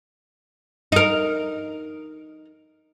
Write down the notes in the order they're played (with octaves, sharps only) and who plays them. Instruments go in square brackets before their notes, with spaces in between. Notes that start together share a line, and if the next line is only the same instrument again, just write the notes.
[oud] D#4 A#4